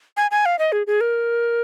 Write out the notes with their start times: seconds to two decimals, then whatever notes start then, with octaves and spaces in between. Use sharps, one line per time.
0.17 G#5
0.31 G#5
0.46 F5
0.59 D#5
0.72 G#4
0.87 G#4
1.01 A#4